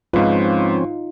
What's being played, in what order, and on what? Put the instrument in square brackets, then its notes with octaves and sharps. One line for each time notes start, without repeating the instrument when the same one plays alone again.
[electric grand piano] G#2 B4 [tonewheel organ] F3 C4 C#4 [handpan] D#4 F4